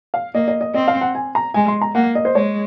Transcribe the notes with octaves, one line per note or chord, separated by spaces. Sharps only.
F5
A#3 D#5
D#5
D#5
C4 D#5
F5
F#5
G#5
A#5
G#3 G#5
C6
A#5
A#3 F#5
D#5
C5
G#3 C#5